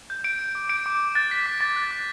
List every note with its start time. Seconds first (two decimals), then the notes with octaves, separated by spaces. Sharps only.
0.10 G6
0.24 G6 D7
0.39 G6
0.55 D6
0.69 G6 D7
0.86 D6
1.00 G6
1.15 F#6 A6
1.31 F#6 B6
1.46 D6 B6
1.61 D6 A6
1.76 F#6
1.91 D6